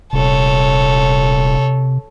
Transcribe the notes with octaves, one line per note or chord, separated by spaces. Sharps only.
D#1 C3 A4 C#5